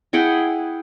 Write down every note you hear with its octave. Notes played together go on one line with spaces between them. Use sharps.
E4 G#4 F#5 G5